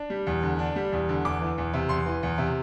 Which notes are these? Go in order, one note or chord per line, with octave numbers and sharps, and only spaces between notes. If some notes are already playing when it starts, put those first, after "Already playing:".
Already playing: D4
G3
E2
D3
D4
G3
E2
D3
E2 D6
E3
E2
C3
E2 C6
E3
E2
C3